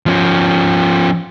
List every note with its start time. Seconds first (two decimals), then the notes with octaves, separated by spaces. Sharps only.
0.06 F3 C#4